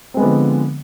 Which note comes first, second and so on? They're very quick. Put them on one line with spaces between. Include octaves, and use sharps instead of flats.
C4 G#3 B3 D3 F3